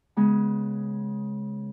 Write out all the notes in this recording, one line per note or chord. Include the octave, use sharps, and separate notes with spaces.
C#3 G#3 B3